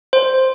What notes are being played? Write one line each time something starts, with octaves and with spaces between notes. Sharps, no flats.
C5